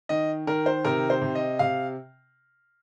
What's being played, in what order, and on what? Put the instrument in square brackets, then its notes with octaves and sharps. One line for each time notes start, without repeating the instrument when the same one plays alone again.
[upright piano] D#3 D#5
D#3 A#4
C5
C3 A#4
C5
C3
D#5
C3 F5